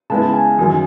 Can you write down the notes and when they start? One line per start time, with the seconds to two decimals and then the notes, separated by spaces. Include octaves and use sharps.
0.10 C#3 G#3 B3 E4 A5
0.34 G#5
0.59 F#2 D#3 F#3